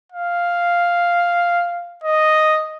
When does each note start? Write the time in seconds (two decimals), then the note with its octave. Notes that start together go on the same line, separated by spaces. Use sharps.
0.12 F5
2.04 D#5